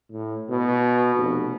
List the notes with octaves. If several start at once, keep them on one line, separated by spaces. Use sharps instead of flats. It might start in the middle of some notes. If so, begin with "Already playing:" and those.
A2
B2
F1